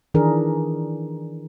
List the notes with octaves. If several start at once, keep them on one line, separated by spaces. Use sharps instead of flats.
D#3 E3 D4 G#4 A#4